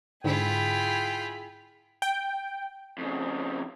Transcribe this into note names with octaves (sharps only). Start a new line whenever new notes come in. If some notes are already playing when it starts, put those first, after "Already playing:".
G#2 D3 E4 F4 G#4 G5 B5
G5
F2 C#3